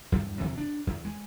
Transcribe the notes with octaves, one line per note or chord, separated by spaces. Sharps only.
E2 G2 G3
F2 C3 E3
D4
E2
G#3